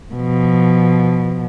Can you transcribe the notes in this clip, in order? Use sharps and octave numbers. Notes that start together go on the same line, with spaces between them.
B2 F3